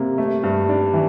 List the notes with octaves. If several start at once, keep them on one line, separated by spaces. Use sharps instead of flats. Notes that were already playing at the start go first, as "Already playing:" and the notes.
Already playing: C3 A#3
A3
G2
D4
E3